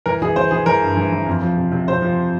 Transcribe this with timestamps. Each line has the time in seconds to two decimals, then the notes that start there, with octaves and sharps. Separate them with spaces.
0.06 E3 A#4
0.22 E3 G#4
0.36 E3 C5
0.51 E3 G#4
0.66 E3 A#4
0.82 G2
0.97 E3
1.12 E3
1.27 F2
1.42 F3
1.57 C3
1.72 C3
1.88 C3 C5
2.02 F3